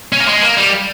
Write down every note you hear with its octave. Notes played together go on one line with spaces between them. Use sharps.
C#4
A#3
G#3
A#3
G3